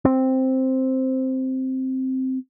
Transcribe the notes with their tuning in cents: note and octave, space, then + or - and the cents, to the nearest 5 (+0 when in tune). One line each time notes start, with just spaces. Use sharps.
C4 +0